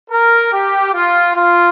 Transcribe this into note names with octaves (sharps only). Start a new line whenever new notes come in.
A#4
G4
F4
F4